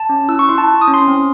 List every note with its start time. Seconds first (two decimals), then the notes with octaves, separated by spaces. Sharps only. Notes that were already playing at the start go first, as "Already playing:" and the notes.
Already playing: A5
0.09 C#4
0.29 E4 E6
0.39 C#6
0.49 E4 C6
0.58 A5
0.68 E4
0.81 D#6
0.88 C#4
0.94 C6
1.08 C4